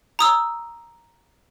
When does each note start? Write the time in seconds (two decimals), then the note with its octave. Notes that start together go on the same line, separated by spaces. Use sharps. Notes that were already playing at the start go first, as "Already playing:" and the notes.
0.19 A#5 D#6 E6